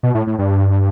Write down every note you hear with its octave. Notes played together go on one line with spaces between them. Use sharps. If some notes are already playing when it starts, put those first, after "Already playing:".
B2
A2
A2
G2